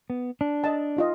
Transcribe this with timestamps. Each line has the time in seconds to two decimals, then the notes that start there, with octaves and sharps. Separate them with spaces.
0.10 B3
0.41 D4
0.64 D#5 A5
0.97 D#4 F4 D#5